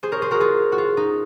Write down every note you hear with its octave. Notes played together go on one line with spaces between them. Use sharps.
G#4 C5
A#4 C#5
G#4 C5
F#4 A#4
F4 G#4
F#4
F4
D#4